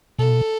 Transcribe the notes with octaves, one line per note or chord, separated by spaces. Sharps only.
B2 A4